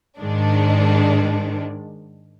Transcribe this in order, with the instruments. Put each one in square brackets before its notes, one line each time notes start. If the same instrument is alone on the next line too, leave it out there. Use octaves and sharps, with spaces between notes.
[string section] G#2 D#3 G#3 D4